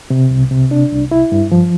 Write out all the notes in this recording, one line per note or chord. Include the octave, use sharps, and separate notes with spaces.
C3
C2
C3
D4
C2
E4
G2
F3